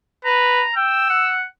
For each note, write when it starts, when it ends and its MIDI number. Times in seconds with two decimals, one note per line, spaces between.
0.25 0.65 71
0.25 0.73 82
0.76 1.08 79
0.76 1.33 88
1.10 1.44 78